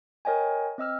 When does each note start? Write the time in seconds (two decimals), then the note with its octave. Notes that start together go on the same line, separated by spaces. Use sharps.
0.25 A#4 C#5 D#5 G5 G#5
0.78 C4 D#5 E6 F6